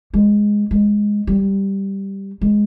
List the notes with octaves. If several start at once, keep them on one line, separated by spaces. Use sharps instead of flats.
G#3
G#3
G3
G#3